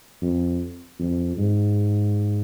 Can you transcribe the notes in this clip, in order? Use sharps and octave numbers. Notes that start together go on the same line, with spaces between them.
F2
F2
G#2